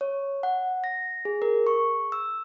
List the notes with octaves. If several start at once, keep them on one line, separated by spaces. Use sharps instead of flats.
C#5
F#5
A#6
G#4
A#4
C#6
E6